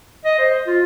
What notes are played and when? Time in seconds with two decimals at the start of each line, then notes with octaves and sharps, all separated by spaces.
0.25 D#5
0.38 C5
0.67 F4